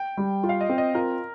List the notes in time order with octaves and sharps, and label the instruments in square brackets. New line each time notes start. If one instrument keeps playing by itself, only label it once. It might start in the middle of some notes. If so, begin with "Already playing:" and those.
Already playing: [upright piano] G5
[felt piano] G3
F4
[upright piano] F5
D#5
[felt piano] C4
[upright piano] D#5
[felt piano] F4 [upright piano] A#4